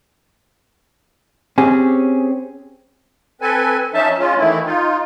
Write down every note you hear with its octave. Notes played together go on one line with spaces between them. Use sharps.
C4 C#4 G4 G#4
C4 A4 B4 G#5
F3 C#4 D#4 E5 A5
G#3 C#4 F4
D#3 E3 A3 E4
D#4 F4